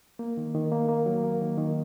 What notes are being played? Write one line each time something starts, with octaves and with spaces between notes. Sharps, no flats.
A#3
D#3
D#3
A#3
A#3
F#3
A#3
D#3
D#3